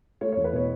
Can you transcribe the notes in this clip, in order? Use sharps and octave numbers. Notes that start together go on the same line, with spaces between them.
A3 C#5
C#5
E2
B4
B2 C#5